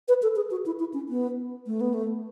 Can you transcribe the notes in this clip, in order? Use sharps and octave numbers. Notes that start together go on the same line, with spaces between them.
B4
A4
G#4
F#4
E4
E4
C#4
B3
A3
B3
A3